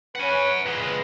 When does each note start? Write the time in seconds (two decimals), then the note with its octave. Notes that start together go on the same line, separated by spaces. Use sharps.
0.16 C#4 B4 F#5 G#5
0.66 A#2 G#3 B4